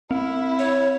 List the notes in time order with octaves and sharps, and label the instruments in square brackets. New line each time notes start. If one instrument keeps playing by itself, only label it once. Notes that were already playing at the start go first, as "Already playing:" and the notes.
[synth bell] C4 [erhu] E4
[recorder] C#5